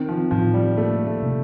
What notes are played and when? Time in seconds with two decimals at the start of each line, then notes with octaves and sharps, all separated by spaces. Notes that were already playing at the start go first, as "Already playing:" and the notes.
Already playing: D#3 C4
0.09 F3
0.31 A2 F3
0.54 G3
0.77 A3 A#3
1.07 A3
1.22 C3